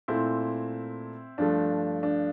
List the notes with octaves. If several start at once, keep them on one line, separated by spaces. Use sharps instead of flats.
A#2 A3 C4 E4
G2 F3 A3 D4
D4